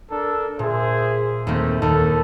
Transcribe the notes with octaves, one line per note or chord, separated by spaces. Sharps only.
D4 A4 A#4
A#2 G#4 C5 E5
D#2 A3 A#3 C4
D#2 A4